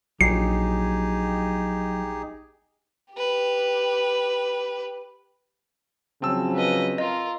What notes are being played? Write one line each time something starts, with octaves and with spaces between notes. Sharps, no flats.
A#1 F#3 D#4 G4 G#4 C7
G4 B4
C#3 F3 F#3 C4 A5 E6
B4 D#5
F4 A#4 D#5